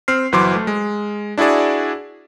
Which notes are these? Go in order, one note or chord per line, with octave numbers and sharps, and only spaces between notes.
C4 F6 C7
G1 E3 F#3 C5 C6 D6
A3
G#3
D4 E4 F#4 G#4 D5